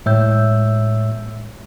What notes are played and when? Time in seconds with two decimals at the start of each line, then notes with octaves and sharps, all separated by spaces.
0.06 A2 G#3 C#5 E5 E6 G6